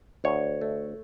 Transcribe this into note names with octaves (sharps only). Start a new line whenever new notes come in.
D2 C#5
A3